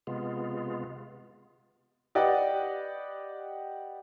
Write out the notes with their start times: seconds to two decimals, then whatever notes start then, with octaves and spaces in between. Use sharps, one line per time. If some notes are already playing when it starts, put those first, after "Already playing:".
0.07 C3 G#3 B3 F4
2.15 G4 B4 D5 D#5 F#5 G5